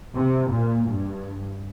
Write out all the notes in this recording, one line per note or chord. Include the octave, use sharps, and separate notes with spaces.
C3
A#2
G2